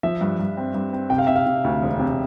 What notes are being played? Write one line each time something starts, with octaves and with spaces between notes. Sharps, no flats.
F3 E5
G2
G2
C4
G2
C4
C3 G5
F5
C3 E5
F5
C3
D2
E1
C3